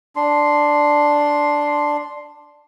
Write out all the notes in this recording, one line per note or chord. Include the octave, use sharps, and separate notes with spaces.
D4 C6